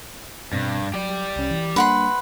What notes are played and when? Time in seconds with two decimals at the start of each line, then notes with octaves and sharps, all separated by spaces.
0.53 G2 B2 C4 A#6
0.94 F#3 G4 D5
1.36 C2 C#4
1.51 E3
1.76 G3 A#3 D4 B4 F#5 C6